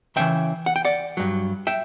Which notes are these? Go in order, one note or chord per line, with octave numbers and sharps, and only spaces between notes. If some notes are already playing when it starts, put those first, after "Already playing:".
E2 C#3 E3 E5 G5
F#5
G5
D5 F#5
G2 F#3
E5 G5